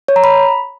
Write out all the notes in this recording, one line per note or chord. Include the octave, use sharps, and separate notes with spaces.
C#5
A#5
B5